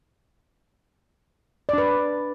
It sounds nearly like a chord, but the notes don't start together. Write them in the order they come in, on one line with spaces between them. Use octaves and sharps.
D5 D4 B4